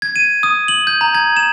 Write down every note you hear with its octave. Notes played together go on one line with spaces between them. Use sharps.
G#6
D#7
D#6
F#7
G6
A#5
G#6
E7